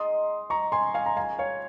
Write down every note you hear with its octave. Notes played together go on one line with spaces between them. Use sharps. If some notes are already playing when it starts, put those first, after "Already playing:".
Already playing: G#3 D#4 G#4 D#5 C6 D#6
A#5 C#6
G#5 C6
F5 G#5
A#5
A#3 C#4 F4 G#4 F5 G#5
C#5 F5